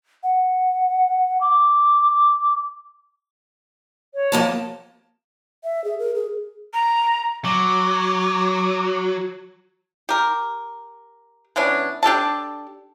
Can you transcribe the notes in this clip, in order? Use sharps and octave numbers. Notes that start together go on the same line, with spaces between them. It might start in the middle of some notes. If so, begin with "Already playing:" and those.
F#5
D6
C#5
F3 A#3 A5
E5
G#4
A#4
G#4
A#5
F#3 D6
G4 A#4
E3 B3 C#4 D4
D4 G4 A4 A5